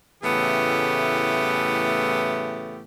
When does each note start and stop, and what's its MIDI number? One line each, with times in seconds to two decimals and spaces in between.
0.23 2.82 45
0.23 2.82 49
0.23 2.82 52
0.23 2.82 57
0.23 2.82 59
0.23 2.82 67